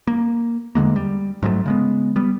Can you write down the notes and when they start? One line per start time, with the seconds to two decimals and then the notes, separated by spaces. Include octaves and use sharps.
0.07 A#3
0.75 E2 D3 G#3 A#3
0.96 G3
1.43 G#2 F#3 G3 A3
1.66 C#3 G#3 B3
2.16 G3 B3